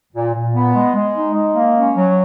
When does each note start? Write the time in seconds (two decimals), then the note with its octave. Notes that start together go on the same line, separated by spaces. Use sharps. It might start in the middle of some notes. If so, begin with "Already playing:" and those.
0.14 A#2
0.33 A#2
0.54 B3
0.74 G#3
0.95 G#3
1.14 D#4
1.34 G#3
1.55 A#3
1.75 C#4
1.96 F#3